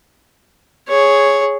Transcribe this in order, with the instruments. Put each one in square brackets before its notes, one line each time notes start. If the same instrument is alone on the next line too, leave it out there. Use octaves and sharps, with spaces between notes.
[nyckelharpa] G#4 C#5